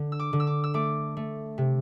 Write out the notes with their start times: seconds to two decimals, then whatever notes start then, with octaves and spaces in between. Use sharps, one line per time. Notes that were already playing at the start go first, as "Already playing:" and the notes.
Already playing: D3
0.12 E6
0.19 D6
0.33 D3
0.40 E6
0.47 D6
0.64 E6
0.74 A3 D6
1.17 A3
1.58 C3